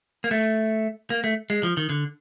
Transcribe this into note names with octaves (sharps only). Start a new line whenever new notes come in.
A#3
A3
A#3
A3
G#3
F3
D#3
D3